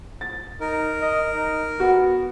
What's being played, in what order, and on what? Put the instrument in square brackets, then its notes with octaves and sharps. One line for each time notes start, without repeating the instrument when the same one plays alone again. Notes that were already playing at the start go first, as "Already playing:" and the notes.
[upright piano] A6
[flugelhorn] D#4 [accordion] A#4
[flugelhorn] D#5
D#4
[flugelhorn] B3 [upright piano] F#4